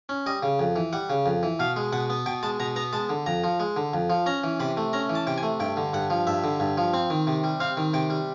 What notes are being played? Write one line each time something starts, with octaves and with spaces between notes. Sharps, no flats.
C#4
G3 D#5
C#3
F2
E3
G3 F#5
C#3
F2
E3
B2 F5
G#3
B2 F#5
B3
B2 G5
G#3 A5
B2 A#5
B3 A#5
G#3 A5
D3
F2 A#5
F3
G#3
D3
F2
F3
C#4 A#5
E3
C3 B5
A3
C#4 A#5
E3
A5
C3 G5
G#5
A3
G2 G5
D3
G2 F#5
F3
G2 E5
D3
G2
F3
C4
D#3
C3
G3
C4 F5
D#3
C3 G5
G3